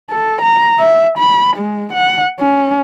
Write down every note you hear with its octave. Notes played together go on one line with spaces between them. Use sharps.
A4
A#5
E5
B5
G#3
F#5
C#4